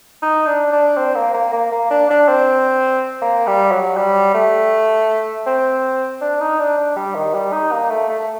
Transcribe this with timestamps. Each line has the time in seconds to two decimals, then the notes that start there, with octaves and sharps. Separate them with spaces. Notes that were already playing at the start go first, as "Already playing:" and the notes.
0.22 D#4
0.47 D4
0.72 D4
0.97 C4
1.15 A#3
1.34 A#3
1.53 A#3
1.72 A#3
1.91 D4
2.10 D4
2.28 C4
3.22 A#3
3.47 G3
3.71 F#3
3.97 G3
4.34 A3
5.46 C4
6.21 D4
6.40 D#4
6.59 D4
6.78 D4
6.96 G3
7.15 D#3
7.34 G3
7.52 D#4
7.72 A#3
7.90 A3
8.09 A3